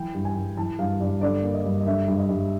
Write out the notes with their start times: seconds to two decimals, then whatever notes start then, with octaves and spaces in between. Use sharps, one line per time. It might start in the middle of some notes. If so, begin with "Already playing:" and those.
Already playing: E3 G5
0.14 G2
0.25 G#5
0.36 G2
0.57 E3 A5
0.79 G2 F5
1.00 G2 D5
1.21 D3 D5
1.43 A#3
1.54 D#5
1.65 G2
1.80 D#5
1.86 D3 E5
2.08 G2
2.18 D#5
2.29 G2